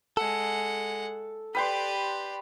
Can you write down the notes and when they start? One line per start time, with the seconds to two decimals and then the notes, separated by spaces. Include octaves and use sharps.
0.17 G#3 A4 F#5
1.55 G4 B4 D5 G5 C6